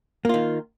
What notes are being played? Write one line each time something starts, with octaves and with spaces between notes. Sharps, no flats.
D#3 A#3 F4